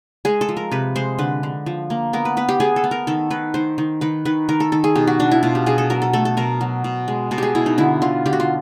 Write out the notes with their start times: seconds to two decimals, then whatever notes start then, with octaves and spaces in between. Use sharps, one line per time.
0.25 G#3 G#4
0.41 A4
0.49 F3
0.57 A#4
0.71 C3 B4
0.96 G#3 C5
1.19 D3 B4
1.43 D3
1.66 F3
1.90 A#3
2.13 B3 A#4
2.25 B4
2.37 B3 B4
2.49 G4
2.60 B3 G#4
2.76 A4
2.84 B3
2.91 A#4
3.07 D#3 A4
3.30 D#3 B4
3.54 D#3 C5
3.78 D#3
4.01 D#3 B4
4.25 D#3 B4
4.49 D#3 A#4
4.60 A4
4.72 D#3 A4
4.84 G#4
4.95 B2 G4
5.07 F#4
5.19 B2 D4
5.32 E4
5.43 B2 F4
5.55 G4
5.66 B2 G#4
5.78 A4
5.90 F#3 A#4
6.02 A4
6.13 A3 A4
6.25 A4
6.37 B2 A#4
6.61 F#3
6.84 B2
7.08 G#3
7.31 B2 A4
7.38 G4 G#4
7.55 B2 E4
7.66 D#4
7.78 D3 E4
8.02 D3 F4
8.26 D3 G4
8.33 F#4
8.40 F4